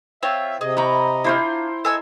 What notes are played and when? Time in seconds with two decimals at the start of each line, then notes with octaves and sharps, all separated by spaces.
0.23 C4 F4 C#5 E5
0.61 C3 G#4 D#5
0.77 E4 A#5 B5 C#6 G6
1.24 D4 E4 F4 C5 G5
1.85 A4 D#5 G#5 E6